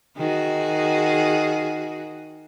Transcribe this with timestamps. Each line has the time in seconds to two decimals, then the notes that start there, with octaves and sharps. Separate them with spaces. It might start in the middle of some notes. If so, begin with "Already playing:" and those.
0.17 D#3 F#4 G#4